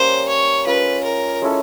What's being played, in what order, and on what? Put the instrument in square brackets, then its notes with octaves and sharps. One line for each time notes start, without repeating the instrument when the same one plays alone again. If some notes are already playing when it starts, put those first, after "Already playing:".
Already playing: [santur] G3 A#3 C#4 [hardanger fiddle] C5
[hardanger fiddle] C#5
[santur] G#3 C#4 F4 G#4 [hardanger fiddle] B4
[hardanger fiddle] A#4
[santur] G#3 C#4 E4 A4